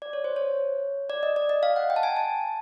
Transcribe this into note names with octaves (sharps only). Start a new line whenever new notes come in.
D5
C#5
C5
C#5
D5
D#5
D5
D#5
F5
F#5
G5
A5
G#5
A5